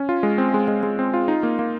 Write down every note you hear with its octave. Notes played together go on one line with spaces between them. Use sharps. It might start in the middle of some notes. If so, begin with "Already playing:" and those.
Already playing: C#4
F4
G#3
C4
G#3
G#3
G#3
C4
F4
D#4
A#3
A#3